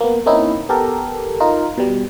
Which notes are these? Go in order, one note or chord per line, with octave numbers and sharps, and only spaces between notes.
A#3 B3
A#3 C4 C#4 D#4 E4
B3 G4 A4 A#4
D#4 F4 A#4
B2 G3